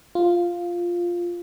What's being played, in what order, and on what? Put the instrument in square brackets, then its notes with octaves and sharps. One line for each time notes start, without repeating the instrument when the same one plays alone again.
[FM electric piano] F4